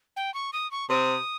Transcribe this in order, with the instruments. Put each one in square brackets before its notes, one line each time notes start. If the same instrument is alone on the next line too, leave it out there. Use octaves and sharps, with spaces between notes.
[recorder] G5
C#6
D#6
C#6
[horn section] C3 C4 [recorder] D#6